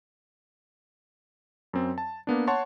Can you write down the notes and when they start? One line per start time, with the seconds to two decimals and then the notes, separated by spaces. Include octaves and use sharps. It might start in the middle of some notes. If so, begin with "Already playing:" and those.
1.73 F#2 C4
1.98 A5
2.27 A#3 B3 D4
2.47 C#5 F#5 A5 C6 C#6